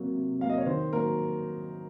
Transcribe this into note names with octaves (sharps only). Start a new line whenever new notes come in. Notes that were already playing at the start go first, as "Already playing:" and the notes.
Already playing: C3 F#3 A#3
C3
F#3 A#3 F5
D#5
C#5
D#3 C5
F#3 A#3 A#4